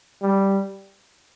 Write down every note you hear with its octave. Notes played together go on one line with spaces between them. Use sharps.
G3